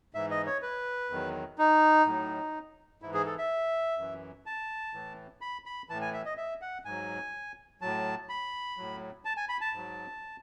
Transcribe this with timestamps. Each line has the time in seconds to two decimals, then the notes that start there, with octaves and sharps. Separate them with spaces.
0.14 G#2 E3 E5
0.31 D#5
0.46 C#5
0.62 B4
1.10 E2 D#3 F#3
1.58 D#4
2.06 A2 F#3
3.02 G#2 E4
3.06 E3
3.14 G#4
3.26 A4
3.38 E5
3.98 F#2 E3
4.46 A5
4.94 A2 E3
5.41 B5
5.66 B5
5.89 A2 E3 A5
6.01 G#5
6.13 E5
6.25 D#5
6.37 E5
6.61 F#5
6.85 G#2 F#3 G#5
7.81 A2 F#3 A5
8.29 B5
8.77 A2 F#3
9.25 A5
9.37 G#5
9.49 B5
9.61 A5
9.73 G#2 F#3